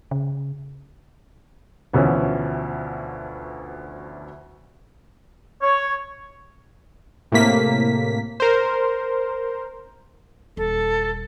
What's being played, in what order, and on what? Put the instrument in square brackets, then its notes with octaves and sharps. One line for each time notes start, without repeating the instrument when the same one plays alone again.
[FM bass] C#3
[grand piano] D2 B2 E3 F3 C#4
[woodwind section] C#5
[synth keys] A2 C3 A#3 B6
A#4 C5
[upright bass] D#1 [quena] A4